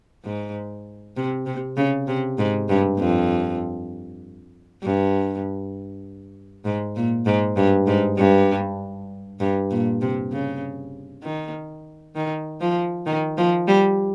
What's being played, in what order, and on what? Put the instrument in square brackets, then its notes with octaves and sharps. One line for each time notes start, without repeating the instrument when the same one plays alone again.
[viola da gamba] G#2
C3
C3
C#3
C3
G#2
G2
F2
G2
G#2
A#2
G#2
G2
G#2
G2
G2
A#2
C3
C#3
D#3
D#3
F3
D#3
F3
G3